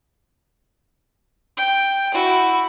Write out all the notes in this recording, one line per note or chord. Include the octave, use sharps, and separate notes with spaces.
G5
E4 F#4